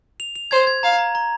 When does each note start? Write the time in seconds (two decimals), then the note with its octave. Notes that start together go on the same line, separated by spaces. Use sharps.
0.20 F7
0.36 F7
0.51 C5 G#6
0.67 G#6
0.83 F5 A#5
0.98 A#5
1.15 A#5